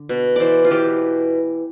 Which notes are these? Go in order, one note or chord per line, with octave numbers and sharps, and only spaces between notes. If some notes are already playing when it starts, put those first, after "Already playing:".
Already playing: D3
B2
E3 C5 D5
F4
E3 G4